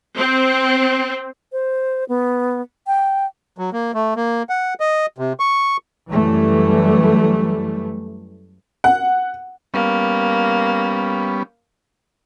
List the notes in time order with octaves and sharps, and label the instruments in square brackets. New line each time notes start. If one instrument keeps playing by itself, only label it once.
[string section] C4
[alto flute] C5
B3
G5
[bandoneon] F#3
A#3
A3
A#3
F#5
D#5
C3
C#6
[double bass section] F#2 E3 G3 A3
[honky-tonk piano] F#5
[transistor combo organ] G3 B3 C#4 [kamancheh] A#3